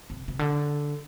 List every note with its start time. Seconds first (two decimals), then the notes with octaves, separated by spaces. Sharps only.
0.10 C3
0.28 C3
0.39 D3